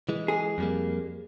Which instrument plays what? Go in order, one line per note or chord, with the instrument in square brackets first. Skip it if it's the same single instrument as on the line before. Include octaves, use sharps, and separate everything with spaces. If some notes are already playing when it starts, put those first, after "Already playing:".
[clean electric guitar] E3 G#3
[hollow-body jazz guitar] G#4
[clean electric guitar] F2 G3 A#3